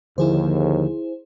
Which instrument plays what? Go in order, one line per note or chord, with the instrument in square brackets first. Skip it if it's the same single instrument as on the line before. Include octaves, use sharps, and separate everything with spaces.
[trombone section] D#2 [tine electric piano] D3 F3 [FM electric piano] E4 G#4 C5